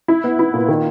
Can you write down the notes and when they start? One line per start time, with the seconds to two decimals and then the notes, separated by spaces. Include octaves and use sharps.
0.08 E4
0.24 B3
0.39 E4
0.54 A#2
0.68 D#3